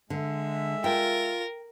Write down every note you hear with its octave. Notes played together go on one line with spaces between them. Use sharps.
D3 G#3 E5
F4 A#4 G5